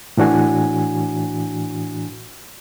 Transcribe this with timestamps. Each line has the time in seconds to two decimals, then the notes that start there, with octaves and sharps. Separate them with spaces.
0.17 A2 E3 D4 F#4 G#5